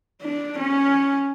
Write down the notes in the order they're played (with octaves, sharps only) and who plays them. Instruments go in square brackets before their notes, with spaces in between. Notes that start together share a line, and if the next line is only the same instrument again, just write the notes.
[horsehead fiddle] D4
C#4